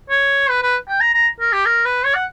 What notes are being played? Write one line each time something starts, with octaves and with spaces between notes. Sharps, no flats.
C#5
B4
B4
G5
A#5
A#5
A#4
G4
A#4
B4
C#5
F#5